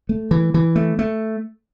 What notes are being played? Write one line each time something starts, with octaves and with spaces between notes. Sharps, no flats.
A3
E3
E3
A3
A3